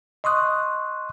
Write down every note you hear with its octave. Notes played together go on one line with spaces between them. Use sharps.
D#5 C6 C#6 D#6 F#6